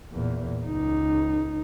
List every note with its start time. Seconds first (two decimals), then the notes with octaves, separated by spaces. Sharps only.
0.11 E2 A#2
0.66 C#2 D#4